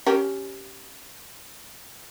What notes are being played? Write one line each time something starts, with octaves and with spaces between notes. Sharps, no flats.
C#4 G4 A#4